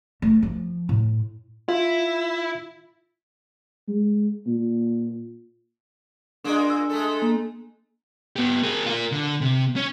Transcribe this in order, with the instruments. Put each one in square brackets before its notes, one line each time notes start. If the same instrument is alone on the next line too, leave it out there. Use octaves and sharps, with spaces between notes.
[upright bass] A3
F3
A2
[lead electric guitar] E4 [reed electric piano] F4
[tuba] G#3
A#2
[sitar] A#2 G#3 A#3 [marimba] D4
[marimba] E6
[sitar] G#3 A3 A4
[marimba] A#3
[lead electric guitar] B3 G4
G#4 A#4
F4 A#4
D3
C3
C#4